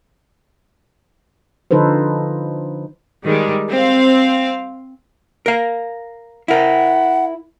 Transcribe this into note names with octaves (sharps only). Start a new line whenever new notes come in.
D3 F3 D#4 A4 B4 C5
D#3 G3 G#3
C4 F5
A#4 F5
E4 A#4 F#5